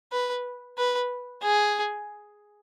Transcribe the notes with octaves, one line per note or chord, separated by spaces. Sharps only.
B4
B4
G#4